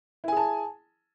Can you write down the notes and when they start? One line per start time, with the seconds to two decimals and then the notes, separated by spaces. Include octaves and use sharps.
0.24 E4
0.28 G#5
0.32 G#4
0.37 A5